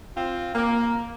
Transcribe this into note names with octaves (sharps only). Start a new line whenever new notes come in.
C4 F4
A#3